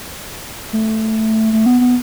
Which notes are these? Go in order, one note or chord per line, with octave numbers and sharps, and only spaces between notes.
A3
A3
B3
B3